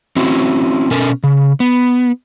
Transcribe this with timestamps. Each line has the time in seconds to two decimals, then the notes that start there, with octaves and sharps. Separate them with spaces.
0.16 C4 C#4 E4 F#4
0.91 B2 C#4 A4 A#4 G#5
1.24 C#3
1.60 B3